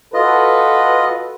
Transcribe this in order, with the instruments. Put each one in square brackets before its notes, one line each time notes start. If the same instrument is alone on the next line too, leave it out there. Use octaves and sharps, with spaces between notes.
[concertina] F4 D#5 [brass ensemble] F#4 A4 B4